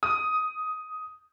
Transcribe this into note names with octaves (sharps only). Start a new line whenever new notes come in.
D#6